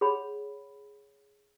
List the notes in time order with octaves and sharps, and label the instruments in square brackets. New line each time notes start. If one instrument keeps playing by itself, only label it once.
[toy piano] G#4 C#5 F#5 B5